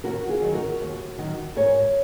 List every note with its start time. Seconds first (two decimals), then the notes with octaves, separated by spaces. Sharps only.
0.04 D#2 F#4 A#4
0.29 F4 G#4
0.42 D#3 F#3
0.54 F#4 A#4
0.81 D#2
1.18 D#3 F#3
1.56 G#2 A#4 C#5